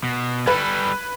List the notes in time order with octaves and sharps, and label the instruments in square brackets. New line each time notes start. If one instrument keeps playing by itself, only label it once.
[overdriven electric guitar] B2
[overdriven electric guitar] G3 A4 [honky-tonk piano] B4 B5 G#6